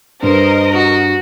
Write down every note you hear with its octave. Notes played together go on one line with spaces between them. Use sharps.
G2 A#4 C5 D#5
F#4